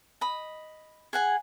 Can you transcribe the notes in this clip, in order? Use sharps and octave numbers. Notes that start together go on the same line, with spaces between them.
D#5 B5
G#4 F#5 G#5